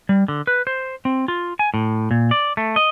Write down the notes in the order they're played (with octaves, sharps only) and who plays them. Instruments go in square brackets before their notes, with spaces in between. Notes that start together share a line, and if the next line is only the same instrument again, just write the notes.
[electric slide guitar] G3
D3
B4
C5
C4
F4
G#5
A2
A#2
D5
A3
D#5